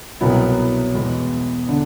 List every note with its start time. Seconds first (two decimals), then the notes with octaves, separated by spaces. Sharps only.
0.21 C2 B2 F#3 B3 E4
0.94 E2 B2 G#3 B3
1.69 D3